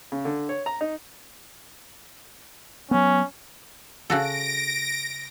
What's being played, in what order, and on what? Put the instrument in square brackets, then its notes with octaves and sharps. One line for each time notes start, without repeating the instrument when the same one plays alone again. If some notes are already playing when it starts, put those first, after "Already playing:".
[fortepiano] C#3
D3
C#5
A#5
D#4
[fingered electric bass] F#3 B3 [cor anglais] C#4
[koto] C#3 F#4 A4 [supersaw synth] A#6 D7